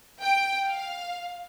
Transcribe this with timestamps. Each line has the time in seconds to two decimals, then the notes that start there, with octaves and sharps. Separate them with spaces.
0.21 G5
0.67 F5